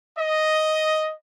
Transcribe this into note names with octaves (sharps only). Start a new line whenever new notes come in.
D#5